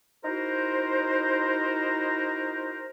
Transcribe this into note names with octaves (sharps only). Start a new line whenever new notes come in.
D#4 E4 F#4 A#4 C5